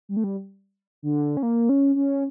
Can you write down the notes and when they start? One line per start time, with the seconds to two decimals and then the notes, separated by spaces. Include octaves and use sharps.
0.09 G3
0.17 A3
0.24 G3
1.02 D3
1.37 C#4
1.43 A#3
1.69 C#4
1.95 C#4